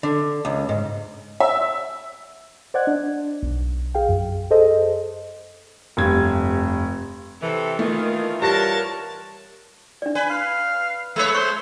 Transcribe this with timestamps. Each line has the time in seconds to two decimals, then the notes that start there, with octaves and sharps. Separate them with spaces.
0.03 D3
0.45 C#2
0.69 G#2
1.40 E5
2.74 C5 D5 D#5 F#5 F#6 G#6
2.87 D4
3.43 B1
3.95 G#4 F5 G5
4.09 F#2
4.50 G#4 A4 C5 D#5
5.97 F1 G2 G#6
7.41 C3 E3 A4
7.79 D#3 E3 A3 F4
8.42 G3 A#4 C#5 F#5 A5 A#6
10.02 D4 D5
10.15 B4 G#5
10.30 F5
11.16 G#3 B4 C#5 E5
11.35 C5 C#6